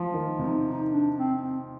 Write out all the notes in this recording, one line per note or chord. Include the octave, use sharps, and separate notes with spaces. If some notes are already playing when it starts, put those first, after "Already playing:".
Already playing: F3
D#3
C3 D#4
D#4
D4
C4
C4